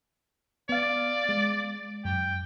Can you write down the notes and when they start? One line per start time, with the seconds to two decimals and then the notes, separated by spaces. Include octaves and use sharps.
0.69 B3 D5 F5
1.29 G#3
2.05 F#2 G5